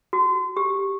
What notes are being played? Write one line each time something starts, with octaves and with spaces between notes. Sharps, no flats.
F#4
G4